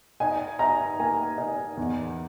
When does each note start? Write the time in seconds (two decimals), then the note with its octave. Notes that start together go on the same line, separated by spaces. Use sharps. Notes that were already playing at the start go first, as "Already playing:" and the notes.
0.20 D#4 G#5
0.59 D#4 A#5
1.00 A#3 G#5
1.38 D#4
1.77 E2